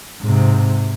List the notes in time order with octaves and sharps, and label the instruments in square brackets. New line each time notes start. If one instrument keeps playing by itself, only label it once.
[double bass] G#2 C3